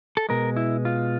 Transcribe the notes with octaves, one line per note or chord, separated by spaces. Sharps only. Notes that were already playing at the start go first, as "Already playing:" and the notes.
A4
B2 G#3 A#4
E4
F4